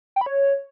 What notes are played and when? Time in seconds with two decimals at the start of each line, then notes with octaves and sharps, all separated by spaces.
0.16 G5
0.21 B5
0.26 C#5